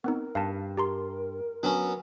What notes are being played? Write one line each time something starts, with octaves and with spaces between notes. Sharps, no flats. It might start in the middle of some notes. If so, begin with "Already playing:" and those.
B3 C4 D#4 A#4
G2 F5 A5
G4 A#4 A#5 C6
F#3 B3 C#4 D4